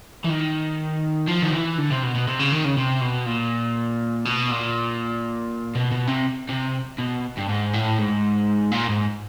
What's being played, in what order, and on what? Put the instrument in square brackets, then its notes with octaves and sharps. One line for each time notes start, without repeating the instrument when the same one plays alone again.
[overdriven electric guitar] E3
D#3
F3
D#3
E3
D3
C3
B2
B2
C3
C#3
D#3
C#3
C3
B2
A#2
B2
A#2
B2
B2
C3
C3
B2
G2
G#2
A2
G#2
A#2
G#2